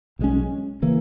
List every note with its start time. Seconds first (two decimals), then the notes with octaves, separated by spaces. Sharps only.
0.19 B1 A#2 G#3 C#4
0.82 C#3 E3 A#3